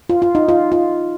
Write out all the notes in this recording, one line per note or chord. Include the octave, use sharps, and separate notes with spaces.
F4
F4
D#4
F4
F4